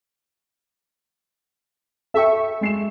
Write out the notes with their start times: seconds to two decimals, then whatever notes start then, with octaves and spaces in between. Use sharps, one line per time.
2.14 A4 E5 G5 C#6
2.61 G#3 C7 E7